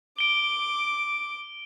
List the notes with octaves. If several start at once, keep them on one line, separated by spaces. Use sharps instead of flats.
D6 D7 G7